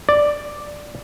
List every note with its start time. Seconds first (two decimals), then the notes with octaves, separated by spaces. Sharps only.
0.09 D5